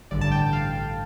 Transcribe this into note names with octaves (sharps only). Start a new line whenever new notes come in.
A1 G2 D3 D5
A5
G5
F5